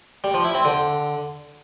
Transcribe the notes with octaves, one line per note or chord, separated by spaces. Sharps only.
G3
F3
E4
C4
D3